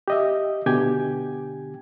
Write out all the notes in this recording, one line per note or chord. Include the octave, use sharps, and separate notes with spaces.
G4 D#5 E5
B2 D3 G4 G5 G#5 G#6